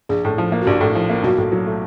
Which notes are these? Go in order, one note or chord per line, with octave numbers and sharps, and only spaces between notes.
A#1 G#4
A2
F3
A#3
F#4
A#1 G4
A2
F3
A#3
B1 F#4
A2
F#3
A3